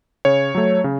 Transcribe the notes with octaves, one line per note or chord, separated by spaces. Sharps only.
C#3 C#5
F#3 A3
C#3